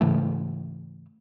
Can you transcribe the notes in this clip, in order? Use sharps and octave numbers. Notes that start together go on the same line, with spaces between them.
G#2 C#3 E3 A3